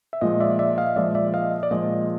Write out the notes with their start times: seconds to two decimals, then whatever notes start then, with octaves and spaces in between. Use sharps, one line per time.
0.13 E5
0.21 A#2 F3 G#3 D#5
0.41 D5 E5
0.59 D5 E5
0.78 D#5 F5
0.96 A#2 F3 G#3 D5 E5
1.15 D5 E5
1.34 D#5 F5
1.63 D5
1.71 A#2 F3 G#3 D#5